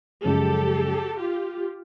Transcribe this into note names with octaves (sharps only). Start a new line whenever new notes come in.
F#2 C#3 F3 G#3 G4 A4
F4 G4